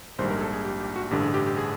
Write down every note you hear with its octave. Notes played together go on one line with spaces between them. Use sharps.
A#1 G#2 D#3 G3 C5
A#4
G#4
A4
G#4
G4
G4
F#4
A1 G2 D3 G4
G#4
G4
G4
G#4